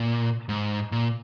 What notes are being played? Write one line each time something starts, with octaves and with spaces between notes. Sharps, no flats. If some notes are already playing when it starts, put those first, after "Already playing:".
Already playing: A#2
G#2
A#2